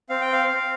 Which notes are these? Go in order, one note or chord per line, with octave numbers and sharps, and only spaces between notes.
C4 F5
G5
F5
C4